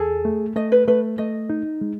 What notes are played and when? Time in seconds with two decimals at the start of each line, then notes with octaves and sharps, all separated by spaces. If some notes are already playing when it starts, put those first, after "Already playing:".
Already playing: E2 G#4 A4
0.25 A3
0.56 A3 D#5
0.72 B4
0.88 A3 B4
1.18 A3 D#5
1.50 D#4
1.81 G#3